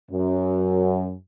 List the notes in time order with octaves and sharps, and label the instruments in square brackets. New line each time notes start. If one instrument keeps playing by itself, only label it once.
[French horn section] F#2